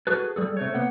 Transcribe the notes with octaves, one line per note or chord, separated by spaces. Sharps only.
F#4 G#4 A4 B4
G3 G#4 A4
C3 A3 C#5
A#3 B3 F#5